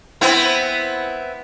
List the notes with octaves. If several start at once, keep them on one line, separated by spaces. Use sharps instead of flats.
B3 C4 E4